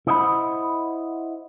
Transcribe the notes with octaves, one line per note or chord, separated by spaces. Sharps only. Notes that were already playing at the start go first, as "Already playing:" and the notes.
E4 C5 D#5 F#5 G5 B5